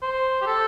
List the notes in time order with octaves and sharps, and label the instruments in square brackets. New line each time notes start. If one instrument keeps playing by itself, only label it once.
[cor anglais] C5
G4
A4